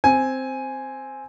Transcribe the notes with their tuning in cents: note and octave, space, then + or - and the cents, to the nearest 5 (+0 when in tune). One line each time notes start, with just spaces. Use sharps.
C4 +0 G#5 +0